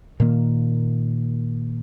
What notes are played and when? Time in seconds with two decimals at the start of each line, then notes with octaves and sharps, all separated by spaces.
0.20 A#2 D#3 A#3